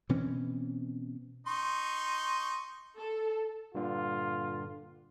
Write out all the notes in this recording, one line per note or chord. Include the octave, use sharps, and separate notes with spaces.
B2 E3 C4 C#4
D#4 C6 C#6
A4
G2 A#2 D3 F4